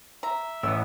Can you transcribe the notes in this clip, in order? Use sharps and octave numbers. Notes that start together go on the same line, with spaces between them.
E5 A#5
A1 A2 B3 E6